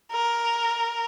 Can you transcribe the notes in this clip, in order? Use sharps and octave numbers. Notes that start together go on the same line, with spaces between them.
A#4